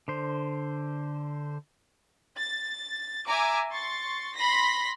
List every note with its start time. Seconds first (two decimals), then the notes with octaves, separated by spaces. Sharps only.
0.08 D3 C5
2.37 A6
3.27 E5 G#5 A#5 D6
3.72 C6 C#6 A6
4.35 B5 C6 A#6 B6